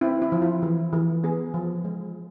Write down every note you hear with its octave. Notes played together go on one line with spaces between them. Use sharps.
C4 E4
E4
F3
F4
E3
E3
B3 G#4
F3
G#3